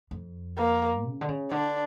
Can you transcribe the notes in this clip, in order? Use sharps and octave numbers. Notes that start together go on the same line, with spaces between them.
F2
A#3
C#3
D3
C#3
D3 D4